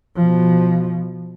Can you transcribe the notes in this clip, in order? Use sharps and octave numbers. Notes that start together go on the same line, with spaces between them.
B2 F3